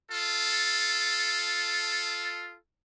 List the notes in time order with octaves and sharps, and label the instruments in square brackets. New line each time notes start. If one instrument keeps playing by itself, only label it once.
[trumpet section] F4 A4